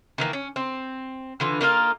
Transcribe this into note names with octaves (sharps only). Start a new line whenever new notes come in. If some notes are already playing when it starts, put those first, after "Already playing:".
D#3 E3 A#3
C#4
C4
D3 E3 F4
A#3 D#4 F4 F5